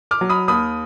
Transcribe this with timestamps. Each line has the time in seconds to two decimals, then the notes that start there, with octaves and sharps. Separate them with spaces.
0.11 D6 F6
0.21 F#3
0.30 B5 D#6
0.48 D#2 B5 D#6